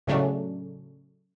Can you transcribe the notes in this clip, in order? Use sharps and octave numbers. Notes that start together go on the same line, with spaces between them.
A2 C#3 F#3 A3 C#4 D4